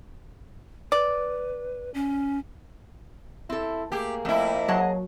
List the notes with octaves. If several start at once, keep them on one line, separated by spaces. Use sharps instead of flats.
B4 D5
C#4
C4 E4 A4
A3 A#3 G4 G#4
F2 A3 E4
F#3 G#4 D#5 A5